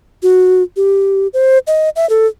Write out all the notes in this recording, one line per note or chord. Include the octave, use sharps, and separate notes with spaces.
F#4
G4
C5
D#5
E5
A4